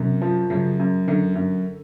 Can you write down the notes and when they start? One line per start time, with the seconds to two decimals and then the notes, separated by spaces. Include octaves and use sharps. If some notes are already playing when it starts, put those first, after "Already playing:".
Already playing: F#2 C3
0.22 F3
0.50 F#2 C#3
0.80 F#2
1.08 F#2 D3
1.35 F#2